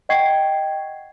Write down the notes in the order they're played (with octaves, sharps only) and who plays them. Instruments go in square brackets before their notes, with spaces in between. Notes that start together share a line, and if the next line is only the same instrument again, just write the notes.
[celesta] D#5 F#5 G5 C#6 G#6 C7